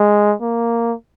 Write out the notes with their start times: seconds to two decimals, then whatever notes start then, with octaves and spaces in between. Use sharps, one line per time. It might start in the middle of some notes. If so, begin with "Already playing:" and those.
Already playing: G#3
0.41 A#3